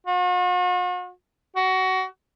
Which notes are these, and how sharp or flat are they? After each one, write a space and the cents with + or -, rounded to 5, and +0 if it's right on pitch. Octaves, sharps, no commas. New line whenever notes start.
F#4 -45
F#4 +20